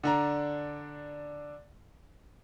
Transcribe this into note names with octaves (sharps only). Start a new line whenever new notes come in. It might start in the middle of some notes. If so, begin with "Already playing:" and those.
D3 D4 A#5